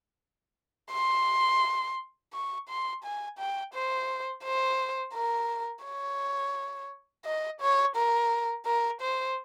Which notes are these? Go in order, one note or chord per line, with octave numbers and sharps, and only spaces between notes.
C6
C#6
C6
G#5
G5
C5
C5
A#4
C#5
D#5
C#5
A#4
A#4
C5